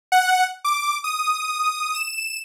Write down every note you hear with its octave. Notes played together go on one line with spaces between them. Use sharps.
F#5
D6
D#6
E7